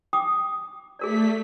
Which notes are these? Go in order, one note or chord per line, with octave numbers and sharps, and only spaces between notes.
G5 D6 D#6
A3 G#4 A#4 D5 B6